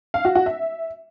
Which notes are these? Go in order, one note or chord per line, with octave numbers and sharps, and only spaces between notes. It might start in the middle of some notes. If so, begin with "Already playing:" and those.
F5
F#4
F#4
E5